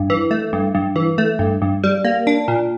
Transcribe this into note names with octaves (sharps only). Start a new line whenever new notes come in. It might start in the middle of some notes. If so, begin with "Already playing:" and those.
Already playing: G2
E3
A3
G2
G2
E3
A3
G2
G2
G3
A#3
D4
A#2